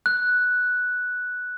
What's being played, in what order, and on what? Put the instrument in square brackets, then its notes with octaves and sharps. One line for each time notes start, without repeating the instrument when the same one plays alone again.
[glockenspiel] F#6